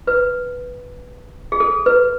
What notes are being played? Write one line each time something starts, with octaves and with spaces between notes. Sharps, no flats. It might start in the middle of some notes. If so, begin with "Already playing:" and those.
B4
G#4
A4
B4